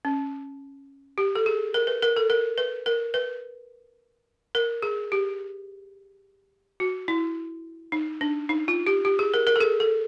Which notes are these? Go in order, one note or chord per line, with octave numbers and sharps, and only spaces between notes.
C#4
G4
A4
G#4
A#4
B4
A#4
A4
A#4
B4
A#4
B4
A#4
G#4
G4
F#4
E4
D#4
D4
D#4
F4
G4
G4
G#4
A#4
A#4
A4
G#4
A4